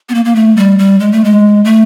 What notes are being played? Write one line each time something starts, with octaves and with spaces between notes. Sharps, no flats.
B3
A#3
A#3
A3
G3
G3
G#3
A3
G#3
A3